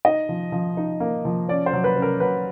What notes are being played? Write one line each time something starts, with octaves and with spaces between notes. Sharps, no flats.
D#4 D#5
F3
F3
D#4
A#3
F3
C#4 D5
C5
F#3
B4
C#4
A#4
F#3 B4